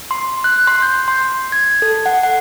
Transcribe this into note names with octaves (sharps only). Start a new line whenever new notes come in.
C6
F#6
C6
G6
C6
G#6
A4
F#5
F#5